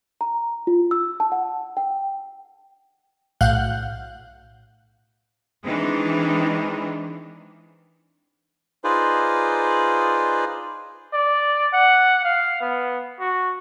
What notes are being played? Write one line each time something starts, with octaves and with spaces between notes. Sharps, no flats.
A#5
F4
E6
A5
F#5
G5
B1 A2 F5 F#5 F#6 G6
D#3 E3 G#3 C4 D4 D#4
D#4 F4 G#4 B4 C5 D5
D5
F#5
F5
B3
F#4